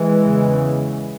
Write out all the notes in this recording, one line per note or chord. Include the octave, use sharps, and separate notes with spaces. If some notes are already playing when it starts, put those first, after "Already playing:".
Already playing: E3 G#3
E2 C#3